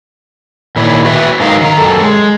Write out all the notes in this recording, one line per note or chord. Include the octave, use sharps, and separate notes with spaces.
A#2 D#3 E4 C#5
F#4 B4 E5
G#2 F#3 D#4 A#4 F5
D#3 A#5
F#2 A4
G#3